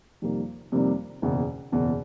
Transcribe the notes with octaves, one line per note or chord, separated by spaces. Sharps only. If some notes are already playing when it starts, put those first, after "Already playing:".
F2 C3 D#3 G3 A#3
F2 C3 D#3 G3 A#3
F#1 E2 B2
F#1 E2 B2